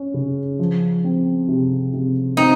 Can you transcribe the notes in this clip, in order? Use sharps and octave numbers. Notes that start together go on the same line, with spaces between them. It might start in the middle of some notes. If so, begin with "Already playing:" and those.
Already playing: C#4
C#3
F3
C4
C3
C3
C4 D#4